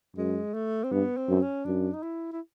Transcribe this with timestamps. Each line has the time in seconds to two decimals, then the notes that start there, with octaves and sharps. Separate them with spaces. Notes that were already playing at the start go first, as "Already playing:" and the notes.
0.16 F#2 G#3
0.54 A3
0.84 C4
0.91 G2 B3
1.17 C4
1.28 F#2
1.42 C#4
1.65 F#2 D4
1.93 D#4
2.03 E4
2.32 E4